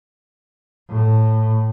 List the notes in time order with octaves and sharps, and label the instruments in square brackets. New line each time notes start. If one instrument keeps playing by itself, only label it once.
[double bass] A2